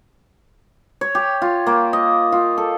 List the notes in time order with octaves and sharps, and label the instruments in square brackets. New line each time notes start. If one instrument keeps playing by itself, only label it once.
[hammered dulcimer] C#5
G4
F4
A#3
D#5
F4
A4